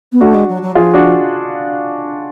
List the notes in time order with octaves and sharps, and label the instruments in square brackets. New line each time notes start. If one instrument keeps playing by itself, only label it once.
[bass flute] B3
[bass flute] A3 [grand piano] D4 F#4
[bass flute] G#3
F#3
F#3
[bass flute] F3 [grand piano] F4 G#4
[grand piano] D4 F#4